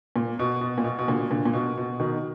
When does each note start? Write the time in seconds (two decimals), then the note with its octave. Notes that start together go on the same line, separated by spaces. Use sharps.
0.16 A#2
0.39 B2
0.61 B2
0.78 A#2
0.84 B2
0.98 B2
1.07 A#2 D3
1.31 A#2 D3
1.46 A#2
1.53 B2
1.77 B2
2.00 B2 D#3